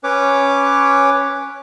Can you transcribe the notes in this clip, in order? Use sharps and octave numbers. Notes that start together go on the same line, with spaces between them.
C#4 B4 C#5 D6